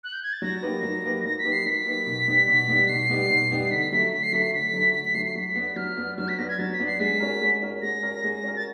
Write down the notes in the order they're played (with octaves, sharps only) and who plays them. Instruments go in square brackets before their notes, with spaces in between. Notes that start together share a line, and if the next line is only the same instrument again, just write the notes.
[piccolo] F#6
G6
G#6
A6
[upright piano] F#3 [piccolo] A#6
[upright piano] A#3 D#4 G4 B4
F#3
A#3 D#4 G4 B4
[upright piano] F#3 [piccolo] A#6
[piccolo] B6
[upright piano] A#3 D#4 G4 B4
[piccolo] C7
[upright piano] F#3 [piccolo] B6
[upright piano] A#3 D#4 G4 B4
B2
G3 B3 D#4 G4
B2
G3 B3 D#4 G4
[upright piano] B2 [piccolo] C7
[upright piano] G3 B3 D#4 G4
B2
G3 B3 D#4 G4
[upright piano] D3 [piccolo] B6
[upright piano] F#3 A3 [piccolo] B6
[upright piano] D3 [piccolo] B6
[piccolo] C7
[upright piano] F#3 A3 [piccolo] B6
[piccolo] C7
[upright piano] D3 [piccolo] B6
[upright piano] F#3 A3
[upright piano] D3 [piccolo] B6
[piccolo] B6
[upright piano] F#3 A3 [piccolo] C7
[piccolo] C7
[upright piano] F#3 [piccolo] B6
[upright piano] B3 D4
[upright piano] F#3 [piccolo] F6
[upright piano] B3 D4
[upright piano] F#3 [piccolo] F6
[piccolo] B6
[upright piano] B3 D4 [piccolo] A#6
[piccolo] G#6
[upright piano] F#3 [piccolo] A6
[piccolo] B6
[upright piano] B3 D4
[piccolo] C7
[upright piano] G#3 [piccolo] B6
[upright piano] C#4 F#4 A#4
G#3
C#4 F#4 A#4
[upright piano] G#3 [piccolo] A#6
[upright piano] C#4 F#4 A#4
G#3
C#4 F#4 A#4
[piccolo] A6